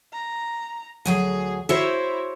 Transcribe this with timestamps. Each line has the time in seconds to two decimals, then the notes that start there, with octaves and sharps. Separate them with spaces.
0.13 A#5
1.05 D2 F#3 G#4 G#5
1.69 E4 F#4 C5 C#5 E5